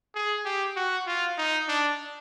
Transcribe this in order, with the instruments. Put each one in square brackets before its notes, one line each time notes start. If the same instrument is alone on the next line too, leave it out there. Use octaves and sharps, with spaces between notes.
[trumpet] G#4
G4
F#4
F4
D#4
D4